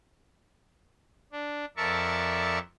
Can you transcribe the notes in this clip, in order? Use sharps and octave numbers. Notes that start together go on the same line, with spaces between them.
D4
F2 A#4 D5 E5 A5 C#6